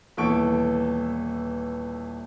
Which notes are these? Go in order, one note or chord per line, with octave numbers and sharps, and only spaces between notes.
D#1 E3 B3 A4 C#6 D7